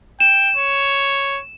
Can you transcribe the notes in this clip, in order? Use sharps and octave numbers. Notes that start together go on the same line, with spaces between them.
G5 E7
C#5